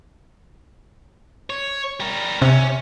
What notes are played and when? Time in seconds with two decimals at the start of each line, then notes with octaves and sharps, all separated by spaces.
1.50 C#5
2.00 G3 A#4
2.42 C3 C#4